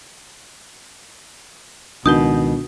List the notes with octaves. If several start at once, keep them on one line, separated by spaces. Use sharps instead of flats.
C#2 B2 D#3 D4 D#6 G6 G7